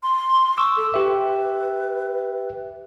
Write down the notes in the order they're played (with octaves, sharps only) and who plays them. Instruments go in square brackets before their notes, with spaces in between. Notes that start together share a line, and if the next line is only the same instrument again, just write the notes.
[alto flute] C6
[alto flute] C#6 [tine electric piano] D6 E6
[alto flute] A4
[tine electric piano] G4 E5 [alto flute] B4